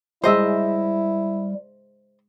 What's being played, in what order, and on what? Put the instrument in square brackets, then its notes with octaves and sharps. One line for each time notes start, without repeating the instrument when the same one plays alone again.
[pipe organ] G3 [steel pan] G#3 G#4 A#5 [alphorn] E4 [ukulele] C5 D#5 E5